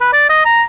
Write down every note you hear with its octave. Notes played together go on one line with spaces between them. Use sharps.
B4
D5
D#5
A#5